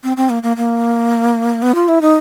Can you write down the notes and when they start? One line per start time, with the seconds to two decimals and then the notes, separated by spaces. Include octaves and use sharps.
0.04 C4
0.17 C4
0.30 A#3
0.43 A#3
0.57 A#3
1.62 B3
1.75 F4
1.88 E4
2.01 D#4